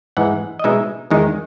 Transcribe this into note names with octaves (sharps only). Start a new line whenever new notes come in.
G#2 E3 G#3 F#5
D#5
B2 G#3 D#4 E5
E2 D#3 G#3 D#4